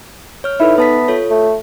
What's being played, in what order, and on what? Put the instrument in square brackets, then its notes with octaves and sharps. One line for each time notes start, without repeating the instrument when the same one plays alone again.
[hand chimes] C#5 F6
[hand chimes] D#4 A4 B4 [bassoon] E4
[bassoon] B3 [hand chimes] E5 A5 B6
[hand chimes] F4 A4 C#5
[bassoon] A3